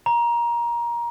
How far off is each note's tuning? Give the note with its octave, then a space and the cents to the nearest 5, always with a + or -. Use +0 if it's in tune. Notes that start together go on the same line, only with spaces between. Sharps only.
A#5 +20